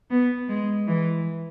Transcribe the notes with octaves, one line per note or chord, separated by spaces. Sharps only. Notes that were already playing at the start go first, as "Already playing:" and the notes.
B3
G#3
E3